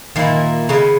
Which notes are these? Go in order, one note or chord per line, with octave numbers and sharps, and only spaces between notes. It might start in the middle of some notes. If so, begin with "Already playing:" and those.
A#2 D#3 A#3 E4
C#3 G#3 B3